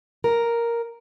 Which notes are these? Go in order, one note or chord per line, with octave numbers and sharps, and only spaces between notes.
A#4